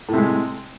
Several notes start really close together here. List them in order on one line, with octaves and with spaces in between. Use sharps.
A2 C3 G#3